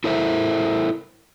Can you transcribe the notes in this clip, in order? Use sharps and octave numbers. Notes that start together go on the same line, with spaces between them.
E4 A4 A#4 C5 E5